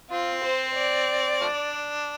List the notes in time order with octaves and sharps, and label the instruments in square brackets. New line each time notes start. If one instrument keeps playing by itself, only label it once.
[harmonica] C4 [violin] F4
[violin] C5
D5
[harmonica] F3 A3 D4